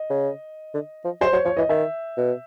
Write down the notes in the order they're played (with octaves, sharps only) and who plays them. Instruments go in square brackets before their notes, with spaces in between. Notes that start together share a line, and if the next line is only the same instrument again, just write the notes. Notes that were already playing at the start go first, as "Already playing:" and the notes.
Already playing: [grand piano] D#5
[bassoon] C#3
D3
F3
[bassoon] F#3 [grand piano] C5
[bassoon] F#3 [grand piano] C#5
[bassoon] F3 [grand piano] C#5
[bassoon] E3 [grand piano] D#5
[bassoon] D#3 [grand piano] E5
[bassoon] B2